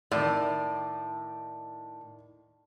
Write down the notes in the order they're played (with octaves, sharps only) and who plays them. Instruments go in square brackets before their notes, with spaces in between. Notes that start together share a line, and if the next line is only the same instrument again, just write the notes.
[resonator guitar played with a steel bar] A2 [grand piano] D#3 D5